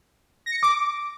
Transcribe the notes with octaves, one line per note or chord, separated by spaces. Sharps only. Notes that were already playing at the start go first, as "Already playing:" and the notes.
A#6
C#7
A#6
D6